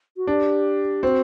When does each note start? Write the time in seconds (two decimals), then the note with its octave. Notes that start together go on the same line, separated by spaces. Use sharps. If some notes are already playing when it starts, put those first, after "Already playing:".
0.17 F#4
0.27 D4 G4
1.02 C4 F#4